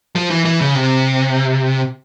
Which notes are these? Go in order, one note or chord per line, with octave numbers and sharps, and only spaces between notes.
F3
E3
E3
C#3
C3